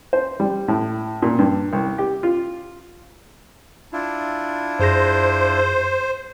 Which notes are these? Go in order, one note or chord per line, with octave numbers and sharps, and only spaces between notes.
C5
G3
A2
A#2
G2
C2
G4
F4
D4 E4 F4
F#2 G#4 C5 A#6